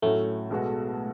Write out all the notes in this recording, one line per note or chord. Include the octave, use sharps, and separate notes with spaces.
A2 F#3 A3 C#4 F#4
B1 B2 G#3 B3 F#4